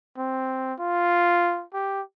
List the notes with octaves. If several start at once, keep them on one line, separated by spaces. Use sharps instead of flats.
C4
F4
G4